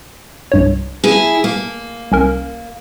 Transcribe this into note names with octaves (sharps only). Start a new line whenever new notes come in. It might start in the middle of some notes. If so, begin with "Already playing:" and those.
C2 G2 C#5
E4 G#4
A#3
C2 C#4 A#4